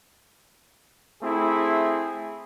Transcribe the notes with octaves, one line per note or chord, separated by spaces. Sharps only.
A3 C4 E4 G#4